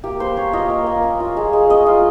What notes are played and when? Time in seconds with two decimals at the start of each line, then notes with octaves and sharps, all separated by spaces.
0.04 A#3 G4
0.20 A#3 C5
0.37 C#4 C#5
0.53 F4 D#5
0.70 A#3
0.87 A#3
1.03 C#4
1.20 F4
1.37 G#3
1.53 G#3
1.70 C#4 D#5
1.86 F4